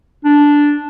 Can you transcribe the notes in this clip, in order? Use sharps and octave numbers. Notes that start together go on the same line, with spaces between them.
D4